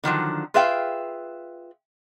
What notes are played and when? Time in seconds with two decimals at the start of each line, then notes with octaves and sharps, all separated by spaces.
0.04 D3 D#3 F3 F#3
0.54 F4 G#4 B4 E5 F5 G5